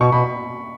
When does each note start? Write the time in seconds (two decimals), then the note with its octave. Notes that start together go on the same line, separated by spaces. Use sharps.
0.01 B2 C#6
0.12 B2 B5